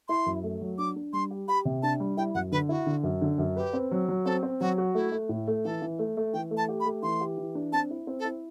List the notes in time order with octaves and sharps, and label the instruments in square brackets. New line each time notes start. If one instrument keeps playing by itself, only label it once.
[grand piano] E4 [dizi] C6
[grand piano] F#2
A3
F#3
[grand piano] D4 [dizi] D6
[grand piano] D4
[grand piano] G3 [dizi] C6
[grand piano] G4
[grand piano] G4 [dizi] B5
[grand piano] C3
[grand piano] D4 [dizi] A5
[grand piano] G3
[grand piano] E4 [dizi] G5
[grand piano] F#2 [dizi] F#5
[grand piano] D3 [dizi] B4
[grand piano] E4 [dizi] F#4
[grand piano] D3
F#2
D3
F#2
[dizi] G4 [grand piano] B4
[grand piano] C4
F#3
F#3
[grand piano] C4 [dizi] A4
[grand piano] C4
[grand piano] F#3 [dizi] F#4
[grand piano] F#4
[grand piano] A3 [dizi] E4
[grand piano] A3
A2
A3
[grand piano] E3 [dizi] A4
[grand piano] E3
A3
A3
[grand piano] E3 [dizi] G5
[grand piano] A3
[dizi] A5
[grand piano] G4
[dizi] B5
[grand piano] A3
[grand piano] E3 [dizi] C6
[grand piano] G4
E3
D4
[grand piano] C4 [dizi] A5
[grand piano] E4
C4
[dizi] A4
[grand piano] E4